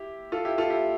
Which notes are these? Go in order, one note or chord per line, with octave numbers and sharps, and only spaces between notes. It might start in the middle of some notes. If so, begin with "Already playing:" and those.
Already playing: E4 G4
F4 A4
E4 G4
F4 A4
E4 G4